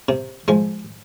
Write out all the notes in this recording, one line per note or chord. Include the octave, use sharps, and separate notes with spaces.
C3
F3 G#3